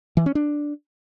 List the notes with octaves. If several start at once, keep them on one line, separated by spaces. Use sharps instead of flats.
E3
C#4
D4